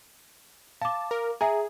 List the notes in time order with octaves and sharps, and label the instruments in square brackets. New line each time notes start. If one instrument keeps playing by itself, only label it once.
[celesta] F5 D6 [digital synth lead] A5
[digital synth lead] A#4
[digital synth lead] G#4 [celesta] E5 G#5 A#5